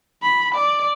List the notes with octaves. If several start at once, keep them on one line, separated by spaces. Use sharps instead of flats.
B5
D5